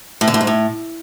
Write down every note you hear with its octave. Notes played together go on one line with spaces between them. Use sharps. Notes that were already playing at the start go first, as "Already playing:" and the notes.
A2
D3
A2
G#2
A2